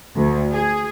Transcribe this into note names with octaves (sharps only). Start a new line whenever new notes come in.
D2
G#4